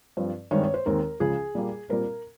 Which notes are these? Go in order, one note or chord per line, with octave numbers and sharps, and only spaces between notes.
G2 F3 C4
G2 D#3 G#3 C4 C#5
C#5
C5
D#2 D#3 G#3 C4 A#4
C#2 C#3 F3 G#4
A#2 G3 A#3
A#2 G3 C4 A#4